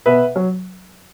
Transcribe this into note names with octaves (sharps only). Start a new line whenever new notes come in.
B2 B4 E5
F#3